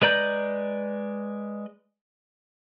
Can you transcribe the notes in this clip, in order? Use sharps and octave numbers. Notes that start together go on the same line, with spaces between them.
G#3 B4 D5 A#5 G6